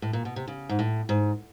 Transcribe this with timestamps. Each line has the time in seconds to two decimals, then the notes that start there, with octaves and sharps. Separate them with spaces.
0.02 A2
0.13 A#2
0.25 B2
0.36 C3
0.48 C#3
0.69 G#2
0.79 A2
1.09 G#2